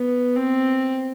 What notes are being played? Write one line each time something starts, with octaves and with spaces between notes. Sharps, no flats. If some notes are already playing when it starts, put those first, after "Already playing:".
Already playing: B3
C4